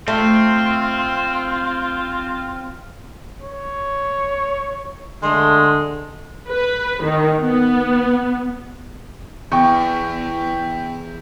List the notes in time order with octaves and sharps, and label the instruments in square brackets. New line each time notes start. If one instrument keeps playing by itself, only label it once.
[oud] A3 [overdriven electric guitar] C4 [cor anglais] F4
[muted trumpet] C#5
[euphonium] D3 [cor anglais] G#3 [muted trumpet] A3 [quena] C6
[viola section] B4
D#3
B3
[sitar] E2 [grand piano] G5 C#6